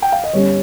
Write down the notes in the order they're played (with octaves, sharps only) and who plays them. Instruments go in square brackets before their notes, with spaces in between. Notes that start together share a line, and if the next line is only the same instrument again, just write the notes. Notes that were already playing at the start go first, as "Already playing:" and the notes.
[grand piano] G5
F5
D#5
[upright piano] G1 G2 G3 C#4 [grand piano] C#5